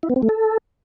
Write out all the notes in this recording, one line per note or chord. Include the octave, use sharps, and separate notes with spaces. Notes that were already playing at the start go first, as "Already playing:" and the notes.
E4
B3
C4
A3
A4